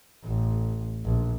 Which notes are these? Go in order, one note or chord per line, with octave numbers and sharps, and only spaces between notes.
A1
A#1